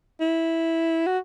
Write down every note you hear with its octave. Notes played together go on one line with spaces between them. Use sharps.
E4
F#4